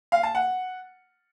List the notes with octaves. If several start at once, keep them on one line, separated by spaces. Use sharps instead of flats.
F5
A5
F#5